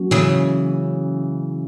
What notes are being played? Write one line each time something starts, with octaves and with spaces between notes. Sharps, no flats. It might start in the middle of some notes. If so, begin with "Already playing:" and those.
Already playing: F#3 A#3 C#4 F#4
C#3 E3